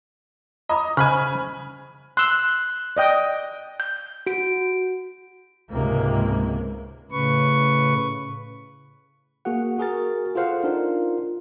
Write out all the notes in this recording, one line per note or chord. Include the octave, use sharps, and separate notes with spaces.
D#5 A#5 B5 D6
C#3 C5 G#5 B5 F6
C6 E6 F#6
D5 D#5 G5
G6
F#4 D7
C#2 G#2 C3 A#3
A2 C#3 B4 C#6
A#3 F#4 G#4 F#5
F#4 G#4 A#4 A6
F4 G#4 A4 C5 F5 F#5
D4 D#4 F4 A#4